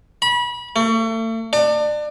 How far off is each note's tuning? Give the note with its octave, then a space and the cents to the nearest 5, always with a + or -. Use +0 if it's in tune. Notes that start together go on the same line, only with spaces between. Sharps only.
B5 -30
A3 +40
D4 +30